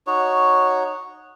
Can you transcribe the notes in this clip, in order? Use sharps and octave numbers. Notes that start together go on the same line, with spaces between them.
D#4 F#4 C#5